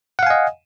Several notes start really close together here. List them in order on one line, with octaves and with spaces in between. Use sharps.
F#5 F5 G#5 D#5